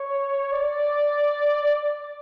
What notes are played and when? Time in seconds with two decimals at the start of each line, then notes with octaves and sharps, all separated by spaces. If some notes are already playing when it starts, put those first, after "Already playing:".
Already playing: C#5
0.52 D5